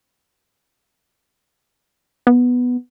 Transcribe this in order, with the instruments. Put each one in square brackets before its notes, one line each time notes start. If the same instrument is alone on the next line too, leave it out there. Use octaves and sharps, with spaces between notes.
[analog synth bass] B3